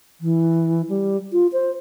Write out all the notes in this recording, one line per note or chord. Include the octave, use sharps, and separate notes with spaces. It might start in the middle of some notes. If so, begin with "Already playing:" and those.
E3
G3
F4
C5